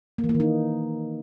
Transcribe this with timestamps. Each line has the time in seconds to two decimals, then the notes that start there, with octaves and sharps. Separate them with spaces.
0.18 A#3
0.24 E3
0.29 A#3
0.35 D#3
0.40 D#4